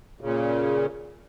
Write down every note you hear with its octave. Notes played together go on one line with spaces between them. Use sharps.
A#2 C#3